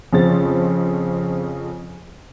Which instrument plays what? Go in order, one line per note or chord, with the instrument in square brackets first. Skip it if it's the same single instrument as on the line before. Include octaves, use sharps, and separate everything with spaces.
[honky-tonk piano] F2 C#3 F3 C5 A6